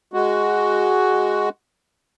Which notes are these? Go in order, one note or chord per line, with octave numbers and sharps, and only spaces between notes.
G#3 F#4